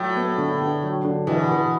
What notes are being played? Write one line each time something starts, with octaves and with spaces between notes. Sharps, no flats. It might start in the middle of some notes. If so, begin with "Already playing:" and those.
Already playing: A2 F#3
B3
D3
D3
F#3
D3
B2 E3
E3